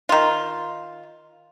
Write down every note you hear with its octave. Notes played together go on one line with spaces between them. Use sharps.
D#3 F4